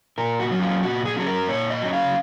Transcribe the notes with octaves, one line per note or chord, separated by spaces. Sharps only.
A#2 A#4
F#4
F#3 C#4
F4
A#2 F#4
G#4
F#3 C#4 G#4
A#4
A#2 C#5
D#5
F#3 C#4
F5